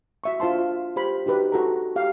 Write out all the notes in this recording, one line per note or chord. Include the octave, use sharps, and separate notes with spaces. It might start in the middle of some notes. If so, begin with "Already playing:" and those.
F#4 E5 C#6
D4 F4 C5 A5 C6
G4 C5 B5
D#4 F#4 G4 B4
F#4 A4 A#5
G4 F5